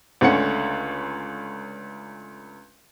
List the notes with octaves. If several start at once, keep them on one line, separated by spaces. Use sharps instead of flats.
C#2 D3 A3 C#4 F#5 C#7